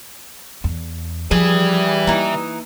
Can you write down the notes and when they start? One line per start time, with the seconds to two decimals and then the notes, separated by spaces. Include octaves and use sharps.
0.64 E2
1.31 F3 G3 G#4 B4 E5
2.07 E3 A#3 D#4